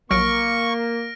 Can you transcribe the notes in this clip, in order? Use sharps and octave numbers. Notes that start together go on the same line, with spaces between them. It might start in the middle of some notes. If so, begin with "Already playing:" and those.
A#1 F#3 A#3 C#6 F6 A#6 D7